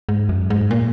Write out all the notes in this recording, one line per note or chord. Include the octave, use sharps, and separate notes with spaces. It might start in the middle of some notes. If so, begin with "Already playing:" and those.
G#2
F#2
G#2
A#2